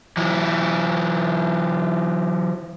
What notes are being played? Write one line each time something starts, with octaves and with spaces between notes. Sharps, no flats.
E3 F#3